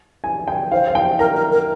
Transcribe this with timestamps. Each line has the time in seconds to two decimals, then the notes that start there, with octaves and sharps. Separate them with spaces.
0.24 G#5
0.48 G5
0.72 C5 F5
0.88 F5
0.95 G5
1.19 A#4 A#5
1.36 A#4
1.52 A#4